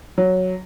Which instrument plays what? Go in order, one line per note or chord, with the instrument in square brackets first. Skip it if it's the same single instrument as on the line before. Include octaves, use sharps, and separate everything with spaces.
[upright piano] F#3